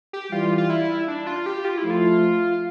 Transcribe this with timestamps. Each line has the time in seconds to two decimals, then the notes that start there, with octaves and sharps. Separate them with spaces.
0.13 G4
0.32 E3 G3 F4
0.58 F4
0.70 E4
1.08 D4
1.27 F4
1.46 G4
1.65 F4
1.77 E4
1.84 F3 A3
1.90 F4